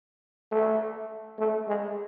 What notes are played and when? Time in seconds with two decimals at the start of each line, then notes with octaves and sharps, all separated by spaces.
0.51 A3
1.38 A3
1.67 G#3